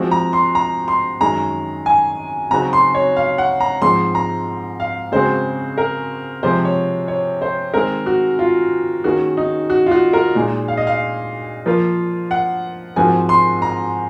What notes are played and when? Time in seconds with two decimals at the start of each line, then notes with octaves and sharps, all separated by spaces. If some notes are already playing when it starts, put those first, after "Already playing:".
Already playing: F3 G#3 C4 F#4
0.11 A#5
0.33 C6
0.55 A#5
0.88 C6
1.21 F#2 D#3 G#3 C#4 A#5
1.86 G#5
2.51 C#3 F#3 C4 D#4 F#4 A#5
2.73 C6
2.95 C#5
3.16 F5
3.38 F#5
3.60 A#5
3.82 G#2 F3 G#3 C4 C6
4.15 A#5
4.80 F5
5.12 C#3 G#3 C4 F#4 C5
5.78 A#4
6.43 C3 F3 G#3 C5
6.65 C#5
7.08 C#5
7.42 C5
7.74 D#3 G#3 C4 A#4
8.06 F#4
8.39 F4
9.04 D#3 A#3 C#4 F#4 G#4
9.37 D#4
9.70 F#4
9.86 F4
9.91 F#4
10.13 A#4
10.35 A#2 G#3 D#4 G#4
10.68 F5
10.77 D#5
10.87 F5
11.66 F3 A#3 F4 A#4
12.31 F#5
12.96 G#2 F3 C4 F#4 A#4 G#5
13.29 C6
13.62 A#5